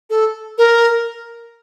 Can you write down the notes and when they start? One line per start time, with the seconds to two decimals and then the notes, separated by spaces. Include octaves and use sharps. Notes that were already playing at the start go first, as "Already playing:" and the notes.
0.10 A4
0.58 A#4